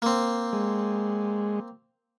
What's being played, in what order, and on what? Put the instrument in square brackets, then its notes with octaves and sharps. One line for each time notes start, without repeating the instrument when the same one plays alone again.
[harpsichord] A#3 C4
[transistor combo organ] G#3